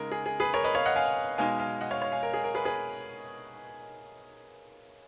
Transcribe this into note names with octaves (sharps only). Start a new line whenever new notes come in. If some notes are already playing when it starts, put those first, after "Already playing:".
Already playing: C#3 G#3 D#4 A#4
G#4
G#4
G#4 B4
A#4 C#5
B4 D#5
C#5 F5
D#5 F#5
F5 G#5
B2 G#3 D#4 F5 G#5
F5 G#5
D#5 F#5
C#5 F5
C#5 F5
F5 G#5
A#4
G#4
A#4
G#4 B4
G#4 B4